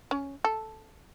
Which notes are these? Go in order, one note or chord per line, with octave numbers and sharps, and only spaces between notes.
C#4
A4